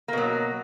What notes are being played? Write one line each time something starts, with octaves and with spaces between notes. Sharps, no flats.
B2 F#3 A#3